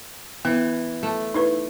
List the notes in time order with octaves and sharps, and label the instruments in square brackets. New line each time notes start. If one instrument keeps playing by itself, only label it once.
[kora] E3 [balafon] B3
[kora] A3
[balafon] D#4 E4 B4